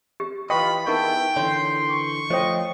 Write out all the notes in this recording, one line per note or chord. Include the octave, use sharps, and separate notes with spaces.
G4
E3 F4 B4 D#5 G5 B5 C#6
B3 D#4 E4 G#4 A#4 G5 C#6
D3 E3 C#5 C6
C#6
F3 A3 C5 C#5 D#5 G5